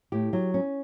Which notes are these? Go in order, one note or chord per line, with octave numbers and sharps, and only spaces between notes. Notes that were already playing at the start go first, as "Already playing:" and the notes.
A2 G4
F#3
C#4